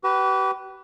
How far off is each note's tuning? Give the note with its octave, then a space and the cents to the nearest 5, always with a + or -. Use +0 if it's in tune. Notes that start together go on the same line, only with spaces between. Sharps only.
G4 -40 B4 +0